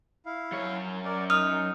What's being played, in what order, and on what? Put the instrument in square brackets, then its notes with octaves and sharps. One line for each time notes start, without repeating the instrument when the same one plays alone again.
[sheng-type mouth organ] E4 F5
[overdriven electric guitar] F#2 C#5
[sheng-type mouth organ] A#4 D5
[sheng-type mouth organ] D#4 [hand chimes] D#6 F6